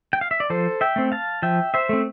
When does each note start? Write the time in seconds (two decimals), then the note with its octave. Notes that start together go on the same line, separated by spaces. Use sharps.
0.13 G5
0.21 F5
0.31 E5
0.40 D5
0.50 F3 A4 C5
0.81 E5 G5
0.96 A3 C4
1.12 F5 A5
1.42 F3 E5 G5
1.74 C5 E5
1.89 A3 C4